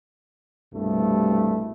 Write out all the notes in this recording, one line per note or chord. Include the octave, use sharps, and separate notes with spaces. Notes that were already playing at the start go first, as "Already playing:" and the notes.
C2 G2 B2 A3